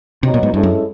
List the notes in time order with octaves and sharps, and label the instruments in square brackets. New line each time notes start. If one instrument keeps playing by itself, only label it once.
[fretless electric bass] C3 [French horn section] F#3 B3 D#4
[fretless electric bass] A#2
G#2
[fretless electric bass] G2 [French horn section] G#3 C#4 E4 A4
[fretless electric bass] F#2